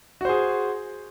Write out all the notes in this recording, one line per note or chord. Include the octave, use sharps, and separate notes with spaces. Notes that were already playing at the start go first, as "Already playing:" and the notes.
F#4 G#4 C5